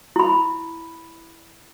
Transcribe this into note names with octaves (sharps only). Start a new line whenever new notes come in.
E4 B5